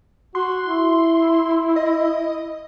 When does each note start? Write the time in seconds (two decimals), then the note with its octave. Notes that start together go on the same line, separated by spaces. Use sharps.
0.35 F#4 C6
0.65 E4
1.76 D#5